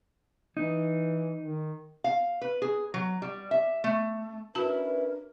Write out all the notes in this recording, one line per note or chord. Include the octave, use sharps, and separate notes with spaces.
E3 D#4
D#3
F5
B4
G#4
F#3
G3
E5
A3
C#4 D4 E4 F#4 A#4 B4 A5